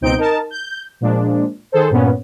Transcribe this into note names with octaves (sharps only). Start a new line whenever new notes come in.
C#2 B2 C4 D#4 G6 D7
D#4 A#4 A5
G6
A#2 F3 G#3 D4
D#3 G#4 A4 C5
G2 A#2 B3 C#4